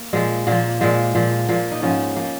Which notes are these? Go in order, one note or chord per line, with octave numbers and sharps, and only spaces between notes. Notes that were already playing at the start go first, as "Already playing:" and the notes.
Already playing: A#3
A#2 F3 G#3
A#2 F3 A#3
A#2 F3 G#3
A#2 F3
A#2 F3 A#3
D#4
G#2 F3 C#4
F3 A#3